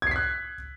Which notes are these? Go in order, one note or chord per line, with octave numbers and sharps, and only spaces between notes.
F#6 G#6 B6 C7